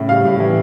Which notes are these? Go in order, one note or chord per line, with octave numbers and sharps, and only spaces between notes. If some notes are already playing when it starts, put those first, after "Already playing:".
Already playing: A2 C#3
G3 F5
A2
E3